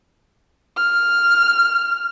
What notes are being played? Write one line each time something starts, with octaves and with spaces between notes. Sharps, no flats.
F6